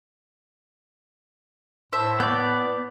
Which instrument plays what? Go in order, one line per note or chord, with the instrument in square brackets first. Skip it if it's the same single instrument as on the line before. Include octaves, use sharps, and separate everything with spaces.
[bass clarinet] A2 [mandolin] C5 E5 A5
[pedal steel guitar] B3 D5 [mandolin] G6